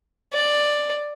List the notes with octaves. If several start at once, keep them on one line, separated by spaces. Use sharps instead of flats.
D5